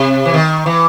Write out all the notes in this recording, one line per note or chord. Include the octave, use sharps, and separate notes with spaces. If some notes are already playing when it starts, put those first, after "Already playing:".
Already playing: C3
E3
D#3
E3